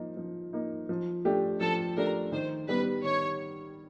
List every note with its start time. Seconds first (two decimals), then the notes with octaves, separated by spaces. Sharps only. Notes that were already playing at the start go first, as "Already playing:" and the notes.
Already playing: F3 A#3 D#4
0.17 F3
0.53 A#3 D#4
0.89 F3
1.25 A3 D4 G4
1.60 F3 A4
1.97 A3 D4 G4 A#4
2.32 D#3 C5
2.68 G3 B3 B4
3.04 D#3 C#5